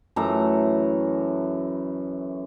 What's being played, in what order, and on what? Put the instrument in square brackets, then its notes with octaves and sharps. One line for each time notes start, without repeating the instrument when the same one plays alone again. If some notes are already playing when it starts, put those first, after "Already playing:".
[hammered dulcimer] F#2 E3 A3 A#5